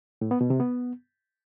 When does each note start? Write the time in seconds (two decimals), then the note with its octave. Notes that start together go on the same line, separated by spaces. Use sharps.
0.21 A2
0.31 B3
0.41 B2
0.50 C3
0.60 B3